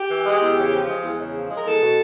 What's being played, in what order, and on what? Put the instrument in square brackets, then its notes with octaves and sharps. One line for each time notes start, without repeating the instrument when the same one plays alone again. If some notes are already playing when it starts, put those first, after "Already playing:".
Already playing: [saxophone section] G4
E3
G#3
E2
C#3
F3
G#3
E2
C#3
F3
G#3
A#4
E2 A4
B2